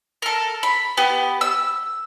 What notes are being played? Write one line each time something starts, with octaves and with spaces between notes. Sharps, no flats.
A4 A#4
B5
B3 G4
E6